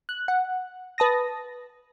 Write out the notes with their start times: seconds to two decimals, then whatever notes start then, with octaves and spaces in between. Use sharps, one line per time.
0.09 F#6
0.28 F#5
0.98 B4 A5 D#6 A#6